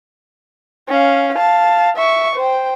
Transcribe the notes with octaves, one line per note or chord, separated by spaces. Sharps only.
C#4 F5
F5 A5
E5 C#6
C5 G5